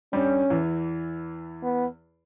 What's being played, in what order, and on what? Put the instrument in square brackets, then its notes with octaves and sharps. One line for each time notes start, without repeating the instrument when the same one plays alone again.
[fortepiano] G2 G3 [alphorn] C#4
[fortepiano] E2 E3
[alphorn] B3